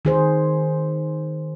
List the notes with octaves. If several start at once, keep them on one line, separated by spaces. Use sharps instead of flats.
D#3 G#4 C5